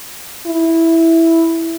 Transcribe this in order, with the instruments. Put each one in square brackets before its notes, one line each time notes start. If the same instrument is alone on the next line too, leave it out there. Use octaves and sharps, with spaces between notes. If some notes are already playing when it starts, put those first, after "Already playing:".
[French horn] E4